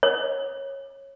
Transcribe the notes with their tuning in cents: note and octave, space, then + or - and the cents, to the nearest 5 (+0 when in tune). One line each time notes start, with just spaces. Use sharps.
C#5 -20